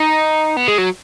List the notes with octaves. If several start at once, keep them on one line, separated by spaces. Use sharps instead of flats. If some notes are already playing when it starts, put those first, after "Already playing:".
Already playing: D#4
B3
G#3
F#3